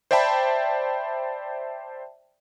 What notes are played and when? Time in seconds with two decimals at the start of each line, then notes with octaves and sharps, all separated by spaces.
0.11 C5 D5 E5 G5 A5 B5